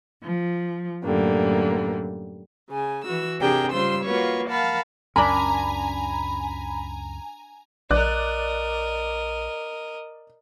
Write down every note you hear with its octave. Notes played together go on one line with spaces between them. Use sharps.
F3
F#2 A2 D3 G3 A#3
C#3 G#5
E3 F#4 E6
C3 D4 G4 G#4 A#4 G5
C#3 G3 F4 C5 C6 E6
A#3 F4 F#4 B4 C#5
A#4 F5 F#5 A5 B5
C#2 F#2 C#4 D4 A#4 G#5 A#5 B5
A#1 A#4 D5 D#5 F#6